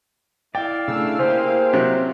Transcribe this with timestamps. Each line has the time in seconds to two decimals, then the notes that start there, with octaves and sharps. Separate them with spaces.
0.55 E4 D5 F5 G5
0.88 C#3 A3 D4 E6
1.19 A#3 G4 G#4 C5
1.73 C3 F#3